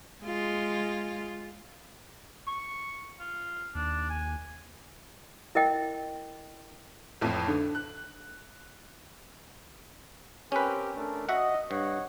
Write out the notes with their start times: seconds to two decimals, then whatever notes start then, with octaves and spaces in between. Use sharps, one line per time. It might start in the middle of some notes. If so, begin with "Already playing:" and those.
0.24 G#3 F4
2.48 C#6
3.20 F4
3.75 D#2 D4
4.10 G#5
5.55 E4 A#4 D#5 G5
7.21 A1 F2 A2
7.48 D3
7.75 F#6
10.52 C4 C#4 G4 A#4 B4
10.96 A3 D4 A#4
11.29 F#4 D#5 E5 F#5
11.71 G2 C#5 D#5 F#5